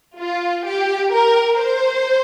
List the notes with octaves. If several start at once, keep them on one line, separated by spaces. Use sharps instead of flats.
F4
G4
A#4
C5